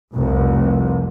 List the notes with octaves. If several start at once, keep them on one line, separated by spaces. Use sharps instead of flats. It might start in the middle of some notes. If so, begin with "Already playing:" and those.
F1 C2